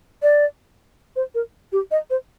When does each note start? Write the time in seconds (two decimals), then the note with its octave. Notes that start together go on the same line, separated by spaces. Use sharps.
0.23 D5
1.16 C5
1.35 A#4
1.72 G4
1.91 D#5
2.10 C5